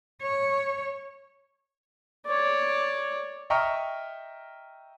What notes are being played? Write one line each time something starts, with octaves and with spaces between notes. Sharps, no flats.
C#5
C#5 D5
D#5 E5 G5 A#5 C#6 F6